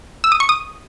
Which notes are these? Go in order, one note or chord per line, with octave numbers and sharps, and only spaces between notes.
E6
D#6
C#6
D#6